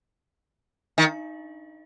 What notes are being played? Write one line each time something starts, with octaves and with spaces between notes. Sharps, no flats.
D#3